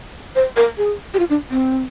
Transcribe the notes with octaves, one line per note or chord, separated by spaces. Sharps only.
C5
A#4
G#4
G4
F4
D4
C4